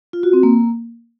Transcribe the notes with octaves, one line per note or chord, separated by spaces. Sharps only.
F4
F#4
C4
A#3